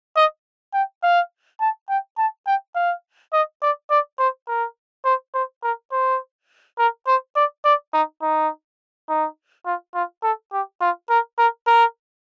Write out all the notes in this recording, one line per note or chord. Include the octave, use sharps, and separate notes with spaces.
D#5
G5
F5
A5
G5
A5
G5
F5
D#5
D5
D5
C5
A#4
C5
C5
A#4
C5
A#4
C5
D5
D5
D#4
D#4
D#4
F4
F4
A4
G4
F4
A#4
A#4
A#4